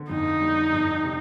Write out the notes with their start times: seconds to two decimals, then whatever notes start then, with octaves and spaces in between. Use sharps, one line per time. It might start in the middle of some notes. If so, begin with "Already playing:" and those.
Already playing: D3 C4
0.10 F2 D#4
0.41 G3
0.73 F2
1.04 C3